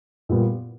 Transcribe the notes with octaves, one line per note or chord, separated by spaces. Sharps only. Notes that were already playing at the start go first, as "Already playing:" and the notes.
A#2 G3 B3 E4